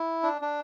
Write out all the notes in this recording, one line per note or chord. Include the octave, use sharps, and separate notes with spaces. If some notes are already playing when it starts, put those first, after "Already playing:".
Already playing: E4
D4
D4